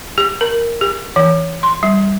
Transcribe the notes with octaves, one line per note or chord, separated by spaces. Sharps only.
G4
A#4
G4
E3
C6
G3